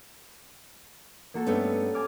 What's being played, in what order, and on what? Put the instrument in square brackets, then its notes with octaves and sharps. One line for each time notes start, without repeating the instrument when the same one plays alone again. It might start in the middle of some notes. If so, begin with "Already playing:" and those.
[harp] A#3 F#4 A4
[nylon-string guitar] G2 A3 B3 [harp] C#4 G4
[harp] G#5 D6 F6